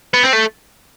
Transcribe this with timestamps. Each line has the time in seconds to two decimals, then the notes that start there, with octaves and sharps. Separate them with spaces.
0.14 B3
0.24 C4
0.33 A3